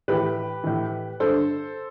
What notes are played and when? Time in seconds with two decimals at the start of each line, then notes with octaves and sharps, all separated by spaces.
0.08 A2 E3 G4 B4
0.64 A2 E3
1.20 G2 D3 A4 C5